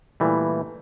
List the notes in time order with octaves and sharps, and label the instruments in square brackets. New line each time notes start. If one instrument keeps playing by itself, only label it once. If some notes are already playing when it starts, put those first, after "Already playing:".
[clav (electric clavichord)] A#2 E3 G3 A3